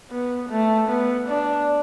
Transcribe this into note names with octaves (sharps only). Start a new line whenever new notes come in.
B3
A3
B3
D4